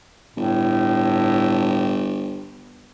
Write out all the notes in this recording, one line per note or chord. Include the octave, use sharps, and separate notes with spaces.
G1 A2